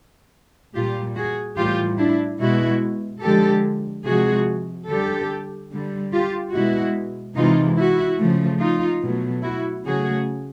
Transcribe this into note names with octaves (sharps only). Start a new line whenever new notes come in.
A#2 G3 F4 G4
F#4 G#4
A2 E3 G3 F4 G4
D4 E4
B2 G#3 E4 F#4
D3 F3 G#3 G4 A4
C3 F3 G#3 F#4 G#4
D3 G3 G4 A4
D3 G3
F4 G4
B2 G#3 E4 F#4
C3 E3 G#3 D#4 F4
E4 F#4
C#3 F3 A3
D#4 F4
B2 F#3 A3
E4 F#4
C#3 F#3 A3 F#4 G#4